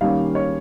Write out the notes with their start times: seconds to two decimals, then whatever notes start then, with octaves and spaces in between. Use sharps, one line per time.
0.01 D#3 G3 A#3 C#4 F5
0.35 C#5